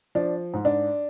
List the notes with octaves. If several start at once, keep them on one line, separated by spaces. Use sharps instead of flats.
F3 D4
G#2
D4